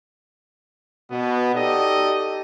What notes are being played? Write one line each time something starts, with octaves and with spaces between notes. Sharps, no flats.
B2 B3
D#4 G4 A4 D5 D#5